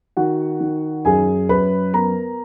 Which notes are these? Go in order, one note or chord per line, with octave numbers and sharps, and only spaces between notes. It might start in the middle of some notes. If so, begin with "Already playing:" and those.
D#3 F#4 F#5
D#3
F#2 G#4 G#5
F#2 B4 B5
B3 A#4 A#5